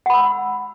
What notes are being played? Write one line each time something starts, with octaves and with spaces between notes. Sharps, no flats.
F#5 B5 E6